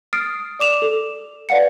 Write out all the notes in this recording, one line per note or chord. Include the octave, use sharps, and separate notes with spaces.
D#6 F6 A6 C7 D7
D5 D6 E7 F7
A4
B4 D5 F5 F#5 C#7